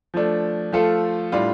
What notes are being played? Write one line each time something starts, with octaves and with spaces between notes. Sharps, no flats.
F3 A3 D4
F3 A3 F4 A4
A2 G3 D4 F4